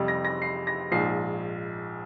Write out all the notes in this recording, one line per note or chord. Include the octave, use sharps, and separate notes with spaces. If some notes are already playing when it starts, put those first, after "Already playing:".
Already playing: F2 C3 G3
A#6
A#6
C7
A#6
A#1 G#2 F3 C7